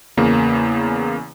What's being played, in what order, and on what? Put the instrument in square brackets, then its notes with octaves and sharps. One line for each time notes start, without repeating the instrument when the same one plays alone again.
[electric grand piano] E2 C#3 A#3